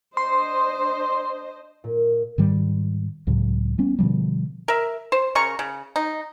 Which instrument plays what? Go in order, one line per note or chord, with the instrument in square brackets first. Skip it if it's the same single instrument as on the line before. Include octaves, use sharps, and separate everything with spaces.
[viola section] D4 C5 D#5 [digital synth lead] C6
[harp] A#2
[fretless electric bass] G#2 D#3 G3
C#2 A2 C#3 F#3
G3 B3 C#4
B2 D3 F3 G3
[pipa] A#4 E5
C5
C#3 A#4 C#6
C#3
D#4